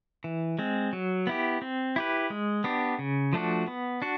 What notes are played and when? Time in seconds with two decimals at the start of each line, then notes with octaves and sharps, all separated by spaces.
0.24 E3
0.59 G#3 C4
0.93 F#3
1.27 B3 E4 G4
1.62 C4
1.96 E4 G4 B4
2.30 G#3
2.64 B3 D4 G4
2.99 C#3
3.33 F3 A3 D4 F#4
3.68 B3
4.02 D4 F#4